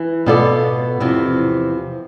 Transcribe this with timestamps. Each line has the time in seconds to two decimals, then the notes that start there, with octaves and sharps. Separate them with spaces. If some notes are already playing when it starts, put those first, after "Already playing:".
Already playing: E3
0.26 B2 B3 F4 A4 D5
1.00 E2 C3 F3